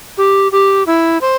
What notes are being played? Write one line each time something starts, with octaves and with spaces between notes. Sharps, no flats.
G4
G4
E4
C5